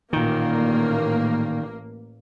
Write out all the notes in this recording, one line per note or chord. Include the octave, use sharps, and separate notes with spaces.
A1 A#2 D#3 A#3